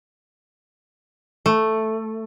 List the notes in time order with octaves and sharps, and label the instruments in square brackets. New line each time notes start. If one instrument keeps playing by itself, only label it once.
[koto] A3